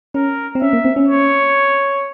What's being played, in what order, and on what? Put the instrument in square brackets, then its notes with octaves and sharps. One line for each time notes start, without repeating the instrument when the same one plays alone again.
[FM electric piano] C#4 [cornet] A#4
[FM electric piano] C4
[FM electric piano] C#4 [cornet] E5
[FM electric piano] A#3
C4
C#4
[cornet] C#5